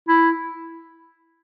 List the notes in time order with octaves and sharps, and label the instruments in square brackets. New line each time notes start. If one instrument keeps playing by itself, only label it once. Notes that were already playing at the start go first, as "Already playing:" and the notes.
[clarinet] E4